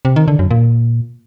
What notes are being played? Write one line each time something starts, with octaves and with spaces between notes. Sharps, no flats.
C3
D#3
D3
F#2
A#2